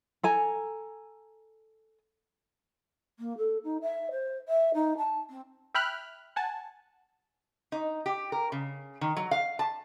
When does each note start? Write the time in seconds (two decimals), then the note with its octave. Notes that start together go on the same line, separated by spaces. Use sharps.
0.23 A4 G#5 A#5
3.18 A#3
3.37 A4
3.64 D#4
3.82 E5
4.11 C5
4.48 E5
4.74 D#4
4.97 A5
5.29 C4
5.75 E5 G5 B5 F6 F#6
6.36 F#5 G#5 A5
7.72 D#4
8.06 G4
8.32 A#4
8.52 C#3
9.01 D#3
9.17 F#3
9.31 F5
9.59 A5